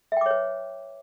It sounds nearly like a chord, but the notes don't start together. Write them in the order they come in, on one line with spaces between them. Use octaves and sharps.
E5 G5 D6 C#5 B4